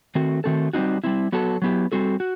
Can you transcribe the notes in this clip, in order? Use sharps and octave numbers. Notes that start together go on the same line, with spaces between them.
D#3 A3 C4 F#4
D#3 A3 C4 F#4 A4
G3 C4 D#4 F#4
G3 C4 E4
F#3 B3 F#4 A4
F#3 B3 E4 G4
G3 C4 F#4 A4
F#4